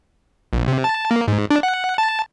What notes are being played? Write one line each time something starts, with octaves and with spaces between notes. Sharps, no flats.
A#1
C3
A5
A#3
G#2
D4
F#5
A5